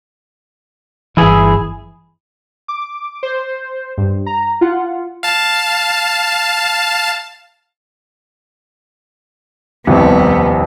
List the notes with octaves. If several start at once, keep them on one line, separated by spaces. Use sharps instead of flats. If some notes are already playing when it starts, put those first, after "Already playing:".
G1 E3 E4 G#4 E5
D6
C5
G2
A#5
F4 F#5
F5 A5
D#1 C2 F2 B3